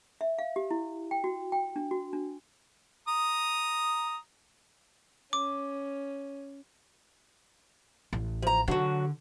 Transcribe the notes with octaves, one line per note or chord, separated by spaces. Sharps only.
E5
F5
G4
E4
G5
F#4
G5
D4
F#4
D4
A#5 D#6
C#4 D6
A1
F3 A#5
D3 F#3 D4 F#4